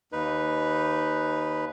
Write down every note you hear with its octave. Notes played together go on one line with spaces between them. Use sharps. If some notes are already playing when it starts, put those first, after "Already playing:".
D#2 D#4 B4